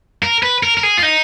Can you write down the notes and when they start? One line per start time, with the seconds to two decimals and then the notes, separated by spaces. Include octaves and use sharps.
0.23 A#4
0.43 B4
0.63 A#4
0.77 A#4
0.83 G#4
0.98 F4
1.03 D#4